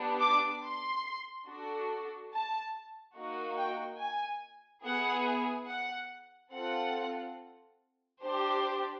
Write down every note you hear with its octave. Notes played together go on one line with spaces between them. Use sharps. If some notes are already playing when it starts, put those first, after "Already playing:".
Already playing: B3 D4 G4
D6
C6
D4 F#4 A4
A5
A#3 D#4 F#4
G5
G#5
B3 E4 G#4 F#5
F#5
C4 F4 A4 F#5
D4 G4 C5